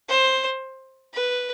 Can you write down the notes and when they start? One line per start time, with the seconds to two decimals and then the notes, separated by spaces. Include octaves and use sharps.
0.09 C5
1.14 B4